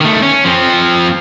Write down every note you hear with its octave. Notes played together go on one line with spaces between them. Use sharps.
D#3 A3
C#4
F3 C4